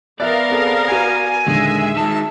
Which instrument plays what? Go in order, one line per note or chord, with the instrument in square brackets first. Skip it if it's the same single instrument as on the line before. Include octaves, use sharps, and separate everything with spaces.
[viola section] B3 A#4 F5 [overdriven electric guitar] D5 [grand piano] E5 F#6 A6
[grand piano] C4 G#4 A4
[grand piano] F#4 G#6 [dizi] G#5
[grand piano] D#2 A#2 D3 [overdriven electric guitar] G#3 [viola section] E5
[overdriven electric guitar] D#3 G#3 [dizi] A5 [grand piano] E7